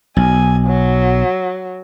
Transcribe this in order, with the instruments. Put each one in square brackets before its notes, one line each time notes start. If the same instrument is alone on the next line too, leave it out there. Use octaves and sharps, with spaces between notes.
[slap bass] B1 [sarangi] G#5
[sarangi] F#3